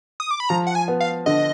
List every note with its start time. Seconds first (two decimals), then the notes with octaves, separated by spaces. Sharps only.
0.20 D#6
0.31 D6
0.40 B5
0.49 F3 A#5
0.67 F#5
0.75 G#5
0.88 B3
1.00 F5
1.26 D3 D#5